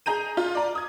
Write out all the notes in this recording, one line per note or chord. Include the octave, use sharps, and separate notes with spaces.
G#4 A#5 G6 D#7
F4
D5 A#5
D#6 G#6